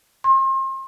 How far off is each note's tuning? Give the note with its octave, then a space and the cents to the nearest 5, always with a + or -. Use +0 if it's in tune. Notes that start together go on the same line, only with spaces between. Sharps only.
C6 +35